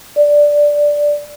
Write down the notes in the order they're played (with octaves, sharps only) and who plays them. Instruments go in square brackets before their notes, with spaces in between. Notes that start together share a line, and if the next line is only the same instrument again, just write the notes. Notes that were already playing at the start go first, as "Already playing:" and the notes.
[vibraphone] D5